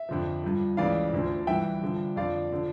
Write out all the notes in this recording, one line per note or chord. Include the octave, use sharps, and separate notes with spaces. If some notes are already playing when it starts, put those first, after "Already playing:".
Already playing: E5
F2 D3 F3
G2 F3
C#2 C#3 E3 D5 F5
D2 D3 F3
G2 E3 E5 G5
G2 D3 F3
F2 D3 F3 D5 F5
D3 F3